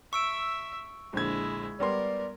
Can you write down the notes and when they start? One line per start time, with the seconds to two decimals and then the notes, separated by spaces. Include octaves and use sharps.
0.13 E5 C#6 E6 D7
1.13 A#1 D3 G#3 E4 G#6
1.80 G3 B3 A#4 D5 C6